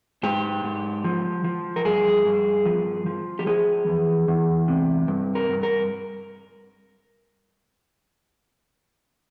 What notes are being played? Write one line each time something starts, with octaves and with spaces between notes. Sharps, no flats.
G#2 G4
G#2
F3
F3
A#4
G2 G#4
G2
F3
F3
G4
F3 G#4
E2
E2
C3
G2
A#4
G2
A#4